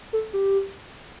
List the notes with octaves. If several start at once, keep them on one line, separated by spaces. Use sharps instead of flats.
A4
G4